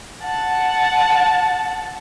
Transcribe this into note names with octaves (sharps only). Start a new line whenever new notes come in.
F#5 A5